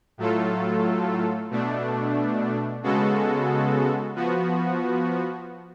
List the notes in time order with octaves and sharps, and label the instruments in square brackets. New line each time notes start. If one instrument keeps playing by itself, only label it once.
[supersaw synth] A2 F#3 A3 F4 A4
B2 A3 D4
C#3 G#3 B3 F#4 A4
F3 B3 F#4